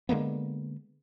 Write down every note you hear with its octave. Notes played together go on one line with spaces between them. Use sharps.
D3 G#3 A#3 B3